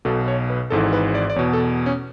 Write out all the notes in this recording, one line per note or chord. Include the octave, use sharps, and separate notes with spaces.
B1 B2 A4
C#5
B4
G#1 G#2 E3 A4
B4
D5
D5
E2 B2 C#5
A4
C#4